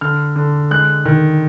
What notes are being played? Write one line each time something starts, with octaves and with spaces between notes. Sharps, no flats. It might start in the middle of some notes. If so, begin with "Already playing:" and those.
D3 F6
D3
G#3 F#6
D#3